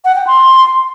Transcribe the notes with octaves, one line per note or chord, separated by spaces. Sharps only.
F#5
G5
C6